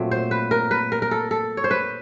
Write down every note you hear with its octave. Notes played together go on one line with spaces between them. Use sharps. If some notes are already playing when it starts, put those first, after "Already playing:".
Already playing: A#2 F#3 A3 C4
C5
B4
A#4
B4
A#4
A#4
A4
A4
C#5
C5
B4